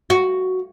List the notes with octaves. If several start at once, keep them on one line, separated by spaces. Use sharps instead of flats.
F#4